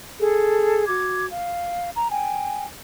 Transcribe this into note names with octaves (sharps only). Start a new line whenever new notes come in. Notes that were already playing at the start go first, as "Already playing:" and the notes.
G#4 A4
F#4 D6 G#6
F5
A#5
G5 G#5